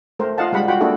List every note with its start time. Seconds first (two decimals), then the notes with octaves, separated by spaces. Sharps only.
0.19 A3 A#4 C5
0.38 F4 D#5 F5 F#5 A5
0.52 G3 G#3 F#5 B5
0.68 F4 F#4 F#5 G5 B5
0.80 A#3 D4 E4 F#4 G#4 A4